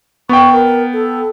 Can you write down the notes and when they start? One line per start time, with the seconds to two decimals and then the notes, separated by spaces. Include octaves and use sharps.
0.29 B3 G5 C#6
0.52 A#4
0.93 A4